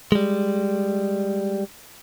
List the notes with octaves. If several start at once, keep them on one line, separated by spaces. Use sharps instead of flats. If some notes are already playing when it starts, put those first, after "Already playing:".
G3 G#3